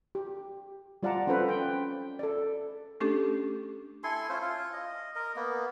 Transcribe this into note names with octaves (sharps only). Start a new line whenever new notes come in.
G4
G3 F4 D5 F#5 A5 A#5
C4 C#4 F4 A4 B4 C5
G5
A4 D5
A3 C#4 D4 G4 A4
E4 A4 G#5 C6
C#4 F4 C5
F4
D#5
A#4 D#5
A#3 B3